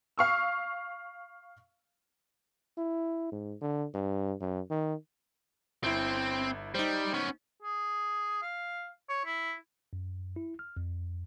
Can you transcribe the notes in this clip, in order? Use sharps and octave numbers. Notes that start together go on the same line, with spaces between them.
F5 C#6 E6
E4
G#2
D3
G2
F#2
D#3
G1 C4 E4
G3 D#4 C5
B3 C#4
G#4
F5
C#5
E4
F#2
E4
F6
F2